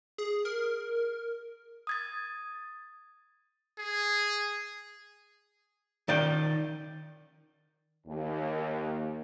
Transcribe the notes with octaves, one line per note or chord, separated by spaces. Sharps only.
G#4
A#4
D#6 G#6 A6
G#4
D#3 D5 G5
D#2